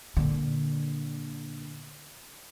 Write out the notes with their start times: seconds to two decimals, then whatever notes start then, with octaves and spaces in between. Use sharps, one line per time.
0.17 A#2 D3